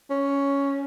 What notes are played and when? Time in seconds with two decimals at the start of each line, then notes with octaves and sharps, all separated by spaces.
0.10 C#4